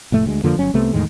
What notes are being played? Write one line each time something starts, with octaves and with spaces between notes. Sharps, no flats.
F1 A2 A3
D2 G#3
F2 D3 F3 A#3
G1 F#3 C#4
C2 C3 A3 B3
E2 A2 D#3 G#3